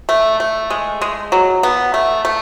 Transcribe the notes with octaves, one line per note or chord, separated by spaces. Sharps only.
A3
A3
G#3
G#3
F#3
B3
A3
A3